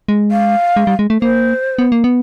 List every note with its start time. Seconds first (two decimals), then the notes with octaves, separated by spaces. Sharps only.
0.08 G#3
0.31 F5
0.76 G#3
0.87 G3
0.99 G#3
1.10 A3
1.21 A#3 C5
1.78 B3
1.92 A#3
2.04 B3